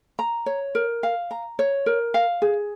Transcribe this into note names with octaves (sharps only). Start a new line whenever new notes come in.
A#5
C#5
A#4
F5
A#5
C#5
A#4
F5
G#4